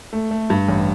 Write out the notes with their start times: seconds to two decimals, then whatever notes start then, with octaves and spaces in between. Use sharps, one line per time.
0.13 A3
0.31 A3
0.50 G2
0.69 A1